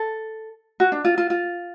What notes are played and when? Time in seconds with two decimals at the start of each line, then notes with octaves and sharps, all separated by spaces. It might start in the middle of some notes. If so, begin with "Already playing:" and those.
Already playing: A4
0.80 F#4
0.92 D4
1.05 F4
1.18 F4
1.30 F4